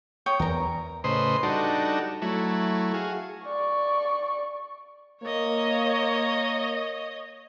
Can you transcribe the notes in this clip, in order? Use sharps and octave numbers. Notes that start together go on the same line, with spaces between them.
C#5 G5 D#6
E2 E3 A#4 A#5
A2 C#3 B4 C5 D#5 C6
G3 D4 D#4 F#4 A4
F#3 A3 E4
F#4 G#4 F5
D5 C#6
A#3 C#5 D#5